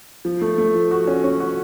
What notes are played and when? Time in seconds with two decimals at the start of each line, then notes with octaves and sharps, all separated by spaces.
0.25 F3
0.42 A3
0.58 A3
0.75 F3
0.91 F#4
1.07 C#4
1.24 C#4
1.40 F#4